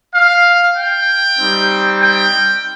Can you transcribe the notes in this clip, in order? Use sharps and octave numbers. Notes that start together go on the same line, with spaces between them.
F5
G5
G3 C4 D#4
G5